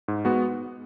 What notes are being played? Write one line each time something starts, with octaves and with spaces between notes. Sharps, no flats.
G#2
G#3 B3 F#4